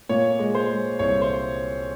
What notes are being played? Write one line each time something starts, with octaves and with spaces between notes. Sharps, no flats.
A#2 C#5
G#3
C5
G#3
C2 C#5
C5